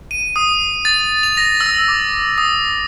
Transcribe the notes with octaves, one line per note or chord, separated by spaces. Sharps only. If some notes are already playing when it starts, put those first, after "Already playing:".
D#7
D#6
A6
F7
A#6
E6
D6
D#6